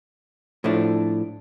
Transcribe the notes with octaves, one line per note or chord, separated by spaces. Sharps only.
A2 F3 A3 D4